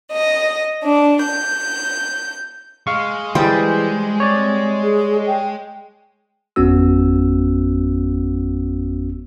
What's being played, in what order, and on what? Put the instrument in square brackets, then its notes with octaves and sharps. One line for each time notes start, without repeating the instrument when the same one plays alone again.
[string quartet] D#5
D4
G6
[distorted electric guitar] G#3 [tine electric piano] F5 C#6
[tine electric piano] E3 G#4 [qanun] G3 G4 C5
[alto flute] C4 [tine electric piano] C#5 D5
[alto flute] G#4
G5
[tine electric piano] G#1 F2 B3 C#4 F#4 E6